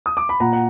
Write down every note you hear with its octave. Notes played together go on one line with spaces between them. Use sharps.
D#6
D6
B5
A#2 F#5 A#5
F#5